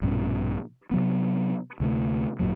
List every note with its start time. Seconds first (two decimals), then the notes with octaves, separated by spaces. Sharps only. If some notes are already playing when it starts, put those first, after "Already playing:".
0.02 A#1 G2 B2 C#4
0.91 C3 F#3 B3
1.80 D2 C3 G3 A3
2.39 G#1 F#2 A#2 F#3